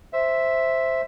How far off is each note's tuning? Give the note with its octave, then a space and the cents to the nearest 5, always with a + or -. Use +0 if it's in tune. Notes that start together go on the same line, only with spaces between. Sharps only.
C5 +0 E5 +0